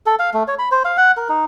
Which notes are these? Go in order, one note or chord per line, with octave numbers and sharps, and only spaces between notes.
A4
F5
A3
C#5
B5
C5
F5
F#5
A#4
D#4